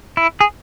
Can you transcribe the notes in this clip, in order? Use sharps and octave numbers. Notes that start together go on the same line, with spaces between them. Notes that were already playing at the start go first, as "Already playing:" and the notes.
E4
G#4